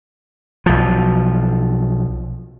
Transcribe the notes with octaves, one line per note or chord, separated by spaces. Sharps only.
B1 F3